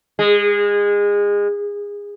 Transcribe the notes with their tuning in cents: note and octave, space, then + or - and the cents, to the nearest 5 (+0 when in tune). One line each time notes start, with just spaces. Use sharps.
G#3 -25